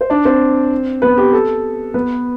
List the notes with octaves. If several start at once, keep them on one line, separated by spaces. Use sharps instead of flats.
C5
D4 D5
C4 C5
B3 B4
G4
A4
B3 B4